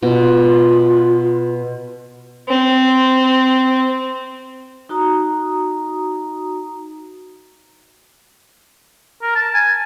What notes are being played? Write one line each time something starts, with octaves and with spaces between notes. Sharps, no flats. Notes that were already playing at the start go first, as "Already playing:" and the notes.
B2 F4
C4
D#4 F#4 A#5 D#6
A#4
A5
G#5